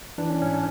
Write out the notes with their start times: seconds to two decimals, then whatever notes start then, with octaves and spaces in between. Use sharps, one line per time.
0.18 E3 D4
0.30 C#4
0.42 G#2 C#4
0.53 D4